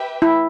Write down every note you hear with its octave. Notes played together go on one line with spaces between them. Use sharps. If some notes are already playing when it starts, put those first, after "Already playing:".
Already playing: G4 B4 E5 G5
E4